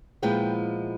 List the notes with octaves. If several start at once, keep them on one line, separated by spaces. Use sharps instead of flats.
A#2 F3 G#3 B3 E4 G5